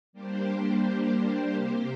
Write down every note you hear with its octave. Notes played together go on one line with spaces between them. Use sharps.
G3 A#3 D4 G4 C5
C3 A#3 G4 C5